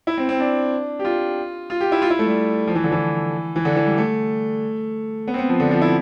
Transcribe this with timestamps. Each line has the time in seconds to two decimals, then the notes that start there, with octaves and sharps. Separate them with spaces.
0.07 E4
0.18 C4
0.29 C4
0.40 D4
0.99 G4
1.05 F4
1.70 F4
1.81 G4
1.92 E4
2.02 F4
2.10 E4
2.19 A3
2.26 G3
2.67 F3
2.75 E3
2.84 D3
2.92 E3
3.56 E3
3.65 D3
3.76 E3
3.87 G3
3.98 A3
5.28 B3
5.34 C4
5.39 B3
5.49 F3
5.60 D3
5.71 F3
5.82 E4